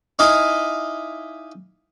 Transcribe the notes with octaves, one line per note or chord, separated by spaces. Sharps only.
D#4 E4 D#5 F5 G#5 D6